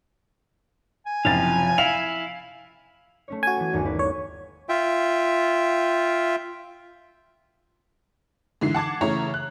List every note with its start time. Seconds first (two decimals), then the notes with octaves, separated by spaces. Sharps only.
1.06 G#5
1.25 F#1 C3 F3 F5 A6
1.78 E4 F5 F7
3.28 A3 C#4 C#5
3.43 F#4 G#5
3.57 E3 B3
3.73 G1 D#2 C#6
3.86 D#3 B4
3.99 C#5
4.69 F4 E5 G5
8.61 G#2 D3 E3 C7
8.74 F#5 A5 D6 G#6
9.01 C#3 E3 A3 E4 C#5 A#5
9.34 F#6